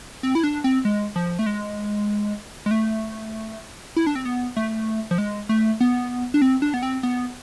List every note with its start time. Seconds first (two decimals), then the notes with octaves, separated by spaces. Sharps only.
0.23 C4
0.35 E4
0.44 D4
0.64 C4
0.85 G#3
1.16 F3
1.39 A3
1.46 G#3
2.66 G#3
2.71 A3
3.96 E4
4.07 D4
4.15 C4
4.25 B3
4.56 A3
5.11 F3
5.18 G#3
5.49 A3
5.80 B3
6.34 D4
6.42 C4
6.62 D4
6.74 B3
6.83 C4
7.03 B3